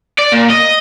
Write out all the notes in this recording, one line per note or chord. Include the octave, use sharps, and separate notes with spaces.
D5
A#2
D#5